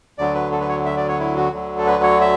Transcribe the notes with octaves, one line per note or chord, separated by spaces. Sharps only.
D2 D3 F#3 D5
B4
A4
B4
C#5
E5
D5
C#5
E4
F#4
D2 D3 F#3
A4
B4
C#5
E5